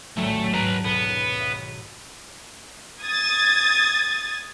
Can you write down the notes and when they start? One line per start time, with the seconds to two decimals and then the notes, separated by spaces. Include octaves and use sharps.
0.17 D#1 A1 F#3 A3
0.54 G#2 B4 F#5 A5 A#5
0.85 B1 B3 B4 B6
1.40 E5
3.03 D#6 G#6 A6